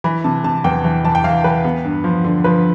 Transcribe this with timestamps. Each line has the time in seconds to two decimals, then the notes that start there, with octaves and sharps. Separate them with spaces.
0.04 E3 B5
0.24 C3 A5
0.44 C3 A5
0.64 E2 G5
0.84 E3
1.04 E3 A5
1.15 G5
1.24 E3 F5
1.44 E3 B4
1.64 B3
1.84 G2
2.04 F3
2.24 D3
2.44 F3 B4